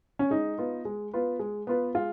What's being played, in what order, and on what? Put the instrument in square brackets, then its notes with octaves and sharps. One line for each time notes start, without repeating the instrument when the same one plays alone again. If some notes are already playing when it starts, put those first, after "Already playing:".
[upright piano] C#4
[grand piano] G#3 [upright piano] D#4
[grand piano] B3 F4 B4
G#3
B3 F4 B4
G#3
B3 F4 B4
[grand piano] G#3 [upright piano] F4